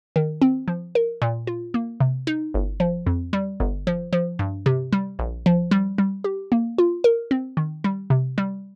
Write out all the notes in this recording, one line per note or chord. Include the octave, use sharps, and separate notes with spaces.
D#3
C4
F3
A#4
A#2
F4
A#3
C3
D#4
G1
F3
F2
G3
G1
F3
F3
G2
C3
G3
A#1
F3
G3
G3
G4
A#3
F4
A#4
C4
D#3
G3
C3
G3